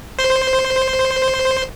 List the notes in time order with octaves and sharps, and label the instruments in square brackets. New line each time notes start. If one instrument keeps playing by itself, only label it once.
[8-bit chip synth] C5 C6